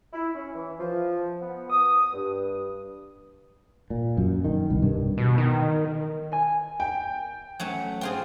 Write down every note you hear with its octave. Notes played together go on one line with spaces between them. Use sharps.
E4
C#4
E3
F3
B3
D#6
G2
A#2
F#2
D#3
C2
G2
B2
D#3
G#5
G5
F#3 A3 C#4
C4 F4 G#4